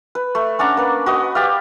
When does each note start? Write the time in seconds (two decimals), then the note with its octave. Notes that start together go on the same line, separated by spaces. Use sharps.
0.15 B4
0.35 A3
0.59 C#4 D4 F#5 A#5
0.77 A#3 B4
1.06 F#4 B4 D#5
1.35 G4 D5 F5